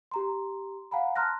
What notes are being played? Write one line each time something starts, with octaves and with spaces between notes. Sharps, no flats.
G4 A#5 C6
F5 F#5 G#5 A#5 B5
A5 A#5 C6 F6 F#6 A#6